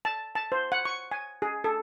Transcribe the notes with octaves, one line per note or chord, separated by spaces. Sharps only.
A5
A5
C5
F#5
C#6
G#5
G#4
A4